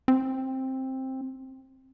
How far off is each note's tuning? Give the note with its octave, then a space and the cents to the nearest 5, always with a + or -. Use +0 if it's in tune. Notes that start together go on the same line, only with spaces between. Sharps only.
C4 +10